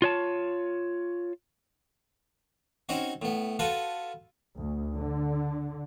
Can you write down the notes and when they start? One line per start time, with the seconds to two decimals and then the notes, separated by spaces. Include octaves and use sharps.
0.02 F4 C#5 A5
2.89 C4 C#4 D#4 F#4
3.22 A2 B3
3.59 F4 F#4 A4 B4
4.57 D2
4.96 D3